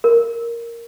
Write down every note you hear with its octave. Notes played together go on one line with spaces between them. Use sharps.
A#4